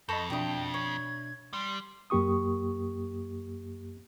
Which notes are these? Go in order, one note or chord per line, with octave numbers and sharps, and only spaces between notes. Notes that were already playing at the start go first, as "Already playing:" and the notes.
F2 A4 D#5 B5 C#6 G6 A#6
B2 D4 A#4 E5 G5 D#6
C#5 G#6
G3 C6
F#2 A#3 G4 C#6 D#6